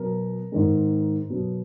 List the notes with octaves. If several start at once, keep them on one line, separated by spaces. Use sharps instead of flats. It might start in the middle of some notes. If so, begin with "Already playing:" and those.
Already playing: B2 F#3 B3 A#4
G#2 D#3 G#3
B2 F#3 B3